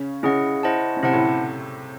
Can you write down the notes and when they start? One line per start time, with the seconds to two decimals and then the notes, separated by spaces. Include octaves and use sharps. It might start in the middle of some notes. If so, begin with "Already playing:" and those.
Already playing: C#3 C#4
0.23 C#3 C#4 E4 G#4 D#5 F#5
0.63 E4 C5 D#5 F#5 A5
0.97 C#4
1.03 C3 C4 E4 C5 F#5 A5
1.13 A2 A3